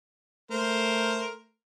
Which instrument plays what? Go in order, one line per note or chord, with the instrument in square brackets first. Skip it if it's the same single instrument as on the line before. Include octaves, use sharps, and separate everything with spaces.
[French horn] A3 [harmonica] A#4 C5